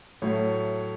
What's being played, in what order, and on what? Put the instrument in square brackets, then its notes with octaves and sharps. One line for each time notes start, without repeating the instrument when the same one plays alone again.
[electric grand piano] A2 F#3 A3 C#5